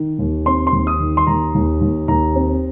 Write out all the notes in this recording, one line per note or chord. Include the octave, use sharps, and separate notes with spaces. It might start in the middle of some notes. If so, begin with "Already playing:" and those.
Already playing: D#3
D#2
C4 C6
C6
D#2
D#6
D#3
C6
D#2 A#5
D#2
D#2
D#2 A#5
C4